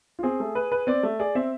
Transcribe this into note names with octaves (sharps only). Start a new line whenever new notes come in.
F4
C4 G#4
A3
B4
B4
C4 D5
A3
G#4 D5
C4 E5